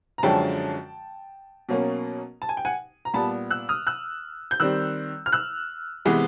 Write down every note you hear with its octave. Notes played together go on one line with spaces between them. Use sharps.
A#5
F#2 D3 F3 G#3 C#4 G5 A5
B2 F#3 A#3 C#4
A5
G#5
G5
F#5 G#5
A#5
A#2 G3 B3 A5 B5
E6 F#6
D#6 F6
E6 F#6
G6
D#3 G3 C4 E6 F#6
F6
E6 F#6
C3 E3 G#3 B3